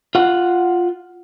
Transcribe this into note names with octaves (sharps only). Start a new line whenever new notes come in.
F4 F#5